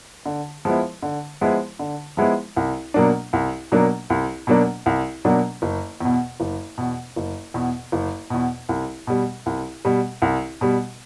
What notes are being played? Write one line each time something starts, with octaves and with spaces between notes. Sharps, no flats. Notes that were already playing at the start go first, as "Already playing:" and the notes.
D3
F3 G#3 B3 E4
D3
F3 G#3 B3 E4
D3
F3 G#3 B3 E4
C2
B2 F#3 A#3 D4
C2
B2 F#3 A#3 D4
C2
B2 F#3 A#3 D4
C2
B2 F#3 A#3 D4
F#1
E2 B2
F#1
E2 B2
F#1
E2 B2
F#1
E2 B2
C2
B2 G3
C2
B2 G3
C2
B2 G3